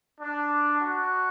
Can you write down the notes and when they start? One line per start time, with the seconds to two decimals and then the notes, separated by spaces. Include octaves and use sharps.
0.21 D4
0.80 F#4